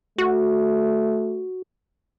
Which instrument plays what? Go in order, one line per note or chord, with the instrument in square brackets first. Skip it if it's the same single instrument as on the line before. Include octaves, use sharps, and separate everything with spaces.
[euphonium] A3 [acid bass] F#4